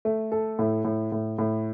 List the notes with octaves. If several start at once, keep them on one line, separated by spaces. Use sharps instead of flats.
A3
A4
A2
A2
A2
A2